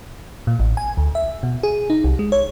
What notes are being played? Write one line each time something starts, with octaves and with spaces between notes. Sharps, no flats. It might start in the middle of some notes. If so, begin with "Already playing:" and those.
A#2
A1
G#5
D2
E5
B2
G#4
D#4
C2
G#3
C#5